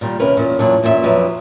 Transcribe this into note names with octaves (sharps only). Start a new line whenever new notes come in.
A#2 D#3 G3
D#2 C3 C#4 A#4 B4
E2 A#2 C#4
E2 A#2 F#3 D4
E2 A#2 C#4 F#4 E5
F2 F3 F#3 D4 B4 E5